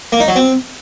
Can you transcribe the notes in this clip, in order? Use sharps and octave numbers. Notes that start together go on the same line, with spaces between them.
A#3
D#4
F#3
C4